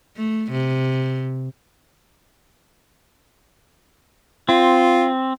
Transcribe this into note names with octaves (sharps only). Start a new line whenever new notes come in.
A3
C3
C4 F4